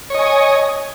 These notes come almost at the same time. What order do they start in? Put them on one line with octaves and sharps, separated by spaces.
C#5 D#5 G#5